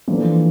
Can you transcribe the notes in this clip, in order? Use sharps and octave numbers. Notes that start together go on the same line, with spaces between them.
E3 F3 A#3 D4 A4